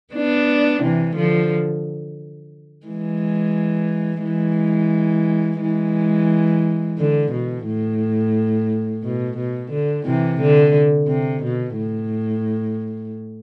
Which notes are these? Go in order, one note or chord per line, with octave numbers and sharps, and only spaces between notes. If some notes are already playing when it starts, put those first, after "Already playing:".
B3 D4
C3 E3
D3 F3
E3 G#3
E3 G#3
E3 G#3
D3
B2
A2
B2
B2
D3
C3 E3
D3
C3
B2
A2